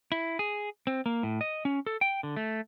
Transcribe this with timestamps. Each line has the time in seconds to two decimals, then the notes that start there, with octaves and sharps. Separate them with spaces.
0.12 E4
0.39 G#4
0.87 C4
1.06 A#3
1.23 A2
1.41 D#5
1.65 C#4
1.86 A4
2.01 G5
2.23 D3
2.36 A3